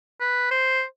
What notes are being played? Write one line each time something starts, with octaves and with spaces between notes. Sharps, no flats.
B4
C5